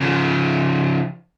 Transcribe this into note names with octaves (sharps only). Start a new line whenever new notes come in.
C#3 F3